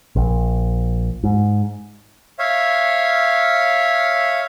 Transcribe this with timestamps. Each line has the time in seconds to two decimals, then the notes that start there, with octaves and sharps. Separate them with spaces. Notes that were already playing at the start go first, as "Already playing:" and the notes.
0.16 A#1
1.24 G#2
2.39 C#5 E5 F5